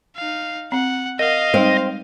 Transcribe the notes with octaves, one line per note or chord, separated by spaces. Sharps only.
D#4 F5
C4 F#5
A#4 D#5 F5 F#5
G3 G#3 C4 D#4